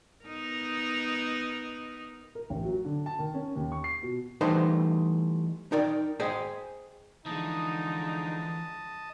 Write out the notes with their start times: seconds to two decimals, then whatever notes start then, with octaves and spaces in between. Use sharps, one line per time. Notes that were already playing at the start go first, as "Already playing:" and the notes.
0.25 B3 D#4 A#4
2.35 A#4
2.50 A1
2.64 F#3
2.85 D3
3.06 A5
3.19 D#3
3.34 C#4
3.56 D#2
3.72 C#6
3.84 C7
4.03 B2
4.41 E3 G3 A3 D#4 B4 C5
5.72 D#4 A#4 D5 G5
6.20 G#4 C5 D#5 G5 G#5
7.26 D3 E3 F3 G#3 D#4 D#5 A5